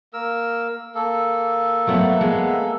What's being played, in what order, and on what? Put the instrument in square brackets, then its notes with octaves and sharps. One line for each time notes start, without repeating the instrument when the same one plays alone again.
[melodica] A#3 A#4 E6
A#3 A4
[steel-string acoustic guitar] F#3 A3 B3
G#3 B3